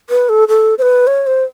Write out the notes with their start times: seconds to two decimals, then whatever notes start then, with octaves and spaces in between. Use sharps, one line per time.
0.10 B4
0.29 A4
0.48 A4
0.78 C5
0.82 B4
1.07 C#5
1.27 C5